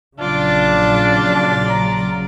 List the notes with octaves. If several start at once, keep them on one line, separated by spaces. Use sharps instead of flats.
A#1 C#3 F#3 D4 F4 D5
A#5